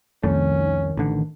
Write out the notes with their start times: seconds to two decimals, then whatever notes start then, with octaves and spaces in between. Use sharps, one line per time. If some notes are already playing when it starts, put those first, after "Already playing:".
0.23 C2 F2 D#3 A3 C#4
0.97 A1 D3